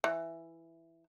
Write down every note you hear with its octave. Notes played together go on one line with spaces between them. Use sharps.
E3